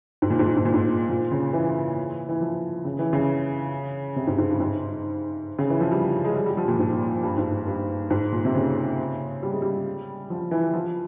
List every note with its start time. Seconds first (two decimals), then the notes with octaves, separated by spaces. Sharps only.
0.22 G#2
0.30 A#2
0.39 G#2
0.48 A#2
0.56 G#2
0.65 A#2
0.74 G#2
1.09 A#2
1.31 C#3
1.53 E3
2.29 E3
2.41 F3
2.85 C#3
2.99 E3
3.13 C#3
4.16 C3
4.27 G#2
4.38 G#2
4.49 G2
4.60 G#2
5.59 C#3
5.70 E3
5.81 F3
5.92 G3
6.25 G#3
6.35 G3
6.46 G3
6.57 F3
6.68 A#2
6.79 G#2
7.23 G2
7.38 G#2
7.67 G2
8.10 G#2
8.33 A#2
8.45 C3
8.55 C#3
9.43 G3
9.52 G#3
9.62 G3
10.30 F3
10.51 E3
10.73 F3